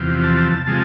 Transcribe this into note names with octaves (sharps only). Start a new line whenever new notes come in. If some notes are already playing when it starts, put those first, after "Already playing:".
Already playing: E2 C3 F3
A5
A5
A5
C3 F3 G#3 A5